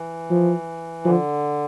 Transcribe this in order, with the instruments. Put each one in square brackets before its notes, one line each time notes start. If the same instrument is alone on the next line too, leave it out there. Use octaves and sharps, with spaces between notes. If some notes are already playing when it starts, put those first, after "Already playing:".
Already playing: [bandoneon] E3
[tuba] F3
[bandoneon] D3 [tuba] F3